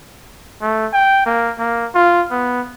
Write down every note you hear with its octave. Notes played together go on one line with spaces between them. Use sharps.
A3
G5
A#3
A#3
F4
B3